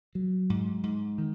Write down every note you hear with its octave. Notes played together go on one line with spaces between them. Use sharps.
F#3
G#2
G#2
D#3